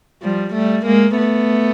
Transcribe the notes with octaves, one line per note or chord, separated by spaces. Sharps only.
F3 G3
G3 A3
G#3 A#3
A3 B3